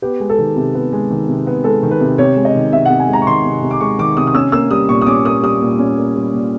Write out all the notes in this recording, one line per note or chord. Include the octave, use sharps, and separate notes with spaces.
B3 G4
G#3
A4
D#3
C3
B3
G#3
D#3
C3
B3
G#3 A4
D#3
B4
C3
C3 C#5
G#3
D#5
D#3
C3 E5
C3 F#5
G#5
G#3 A#5
C#6
D#3 C6
C3
C3
D6
G#3 C#6
D#3 D6
C3 D#6
D#6
C#4 E6
A#3 E6
G3 D#6
A#2 C#6
D#6
C#4 D6
A#3 D#6
G3 D#6
A#2
C#4
A#3
G3
A#2